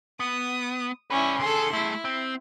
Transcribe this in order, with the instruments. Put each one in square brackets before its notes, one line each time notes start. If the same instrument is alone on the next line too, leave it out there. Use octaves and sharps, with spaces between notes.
[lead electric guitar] B3 [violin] D#6
[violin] C#4 E4 [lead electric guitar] B4 D5
[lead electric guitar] D3 G#4 [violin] A4 C6
[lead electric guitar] A3 G#4 [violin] E4
[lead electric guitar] C4